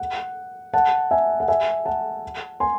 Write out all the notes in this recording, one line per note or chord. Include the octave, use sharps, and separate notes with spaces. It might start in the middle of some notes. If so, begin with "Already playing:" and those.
Already playing: F#5
F#5 A5
E5 G#5
F#5
E5 G#5
F#5 A5
G#5 C6